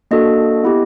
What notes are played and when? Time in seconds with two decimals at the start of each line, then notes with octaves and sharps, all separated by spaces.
0.11 A#3 D4 F#4 A4 D#5
0.64 B3 E4 G4